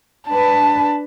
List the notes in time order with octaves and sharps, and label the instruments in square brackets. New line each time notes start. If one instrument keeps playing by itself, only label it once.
[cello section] D4 B4 [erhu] A5